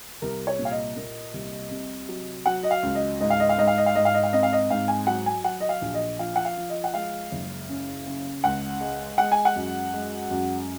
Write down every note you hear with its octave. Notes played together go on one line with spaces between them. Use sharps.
C2 A#4
C#5
A#2
F5
D#5
A#3
C2
C3
F#3
F#3 F#5
D#5
F5
C#2
D#5
G#2 D#5
F5
D#5
F5
G#2 D#5
F5
D#5
F5
G#2 D#5
F5
D#5
F5
C4 D#5
F5
D#5
G#2 F5
G#5
F#3 F#5
G#5
F#3 F#5
D#5
F5
A#1
D#5
F3 F5
F#5
F5
F3
D#5
F#5
G#3 F5
F#1
C#3
C#3
C#2 F#5
G#3
G#3 F#5
G#5
F#5
F#2
G#3
F#2